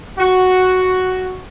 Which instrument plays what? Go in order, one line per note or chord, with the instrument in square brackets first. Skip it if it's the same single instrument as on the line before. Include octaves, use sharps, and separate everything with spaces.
[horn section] F#4